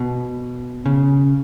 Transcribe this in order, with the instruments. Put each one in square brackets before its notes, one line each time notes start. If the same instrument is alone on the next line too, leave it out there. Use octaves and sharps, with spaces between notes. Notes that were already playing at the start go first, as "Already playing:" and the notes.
Already playing: [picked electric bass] B2
C#3